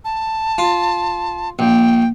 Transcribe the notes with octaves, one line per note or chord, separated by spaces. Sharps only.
A5
F4
A#1 G5